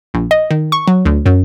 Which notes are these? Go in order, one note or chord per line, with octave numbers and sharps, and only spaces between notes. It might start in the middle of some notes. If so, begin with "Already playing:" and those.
A#1
D#5
D#3
C#6
F#3
D2
F#2